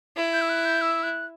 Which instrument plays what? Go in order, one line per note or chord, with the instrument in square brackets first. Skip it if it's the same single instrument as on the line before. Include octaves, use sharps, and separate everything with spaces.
[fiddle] E4
[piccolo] G6
E6
F#6
G6
E6
F#6